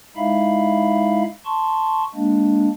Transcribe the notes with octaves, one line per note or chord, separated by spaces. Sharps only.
G#3 D#4 E4 E5 F5 B5
A5 C6 C#6
G#3 A#3 D4